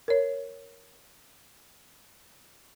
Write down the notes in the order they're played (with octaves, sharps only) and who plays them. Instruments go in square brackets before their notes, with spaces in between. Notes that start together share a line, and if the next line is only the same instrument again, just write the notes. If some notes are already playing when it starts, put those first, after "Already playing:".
[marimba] A#4 C#5